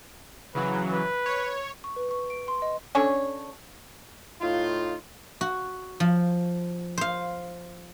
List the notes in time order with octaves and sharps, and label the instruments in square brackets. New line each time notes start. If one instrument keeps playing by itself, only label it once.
[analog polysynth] C#3 E3 F#3 [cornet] B4
[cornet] B4
[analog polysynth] C#5
[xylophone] C#6
B4
C#6
D7
C6
D#5
[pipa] C#4 D4 A4 C#5
[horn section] A2 D#4 F4
[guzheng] F#4
F3
C5 F5